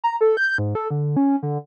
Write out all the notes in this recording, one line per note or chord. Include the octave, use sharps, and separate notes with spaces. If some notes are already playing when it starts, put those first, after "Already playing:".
A#5
A4
G6
G#2
A4
D3
C#4
D3